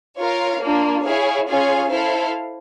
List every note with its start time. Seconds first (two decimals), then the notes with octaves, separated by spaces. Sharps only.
0.18 F4 A#4 C#5 F5
0.61 A#3 D4 F4
1.04 E4 G#4 C#5 F5
1.47 C#4 F4 G#4 C#5 F5
1.90 E4 A4 C5 F5